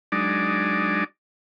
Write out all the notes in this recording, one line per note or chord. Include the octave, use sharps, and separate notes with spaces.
F#3 G#3 D4 D#4 D5